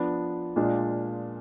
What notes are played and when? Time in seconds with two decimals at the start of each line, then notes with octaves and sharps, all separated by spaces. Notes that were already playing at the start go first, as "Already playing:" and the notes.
Already playing: F3 B3 D4
0.56 A#2 G#3 D4 F4